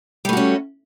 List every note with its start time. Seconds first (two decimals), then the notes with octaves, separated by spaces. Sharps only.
0.25 G3
0.29 A3
0.33 F#4
0.37 C#4